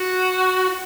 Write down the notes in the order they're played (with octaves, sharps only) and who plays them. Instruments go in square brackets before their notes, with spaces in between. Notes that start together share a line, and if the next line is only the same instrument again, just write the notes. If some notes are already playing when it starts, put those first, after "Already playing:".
Already playing: [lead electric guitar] F#4